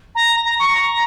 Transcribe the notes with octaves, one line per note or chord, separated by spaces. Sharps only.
A#5
A#5
C#6
A#5